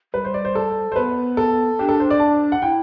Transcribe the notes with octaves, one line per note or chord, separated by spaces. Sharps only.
G3 B4
C5
D5
C5
A4
C5
B3 B4
A4
D4 G4
A4
C5
D5
A5
F#5
E4 G5